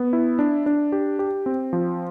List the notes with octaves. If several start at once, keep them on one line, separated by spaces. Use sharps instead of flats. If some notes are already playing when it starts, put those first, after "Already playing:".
Already playing: B3
E4
D4
D4
G4
G4
C4
F3